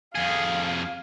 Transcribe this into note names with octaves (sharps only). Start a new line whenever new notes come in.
F2 G#4 F5